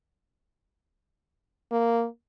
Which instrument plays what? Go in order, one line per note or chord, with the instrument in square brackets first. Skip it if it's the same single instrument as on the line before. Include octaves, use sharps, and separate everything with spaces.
[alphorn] A#3